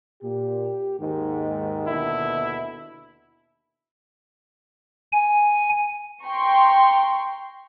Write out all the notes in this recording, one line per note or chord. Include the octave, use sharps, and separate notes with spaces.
A#2 G4
D#2 G#2 D#3
D#2 B2 D3 E4
G#5
G5 A#5 C6 C#6